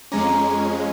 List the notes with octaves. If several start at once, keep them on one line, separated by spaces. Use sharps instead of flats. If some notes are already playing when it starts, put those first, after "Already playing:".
F2 G#3 C#4 A#4 A#5 D6